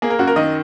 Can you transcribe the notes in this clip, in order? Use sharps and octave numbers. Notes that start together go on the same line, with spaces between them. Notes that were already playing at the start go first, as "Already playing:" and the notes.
A#3 G#4
A#4
F#2 F#4
A#4
D#3 D#5